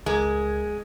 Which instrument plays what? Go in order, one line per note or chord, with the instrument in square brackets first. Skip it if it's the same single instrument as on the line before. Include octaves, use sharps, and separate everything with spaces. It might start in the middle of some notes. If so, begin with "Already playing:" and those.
[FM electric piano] C#2 A#4 G#6 [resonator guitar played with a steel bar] G#3